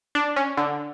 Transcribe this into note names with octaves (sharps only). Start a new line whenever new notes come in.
D4
C#4
D3